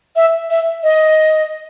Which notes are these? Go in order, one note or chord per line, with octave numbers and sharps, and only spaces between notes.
E5
E5
D#5